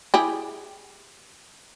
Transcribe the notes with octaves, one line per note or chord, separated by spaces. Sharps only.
E4 G4 G#4